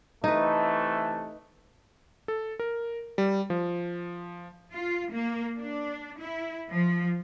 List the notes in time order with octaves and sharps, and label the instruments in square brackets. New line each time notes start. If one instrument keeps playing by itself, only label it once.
[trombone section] C3 E3 A3 [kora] D#4 B4
[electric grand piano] A4
A#4
G3
F3
[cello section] F4
A#3
D4
E4
F3